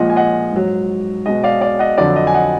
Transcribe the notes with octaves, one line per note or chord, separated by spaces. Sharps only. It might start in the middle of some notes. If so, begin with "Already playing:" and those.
Already playing: A#2 F3 G#3 D#5 F#5
G#5
D#5 F#5
G#2 F#3
B2 G#3 D#5
D5 F5
D5 F5
D#5 F#5
F2 D3 F#3 D5
D#5
G#5
D#5 F#5